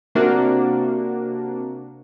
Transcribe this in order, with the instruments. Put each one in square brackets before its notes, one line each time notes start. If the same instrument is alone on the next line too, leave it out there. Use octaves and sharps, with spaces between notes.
[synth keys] C3 A#3 D4 F#4